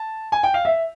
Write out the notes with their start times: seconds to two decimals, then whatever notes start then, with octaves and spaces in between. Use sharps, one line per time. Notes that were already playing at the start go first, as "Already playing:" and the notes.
Already playing: A5
0.32 G#5
0.43 G5
0.54 F5
0.65 E5